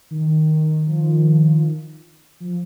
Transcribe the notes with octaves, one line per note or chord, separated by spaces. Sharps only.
D#3
D#3
D#3
F3
F3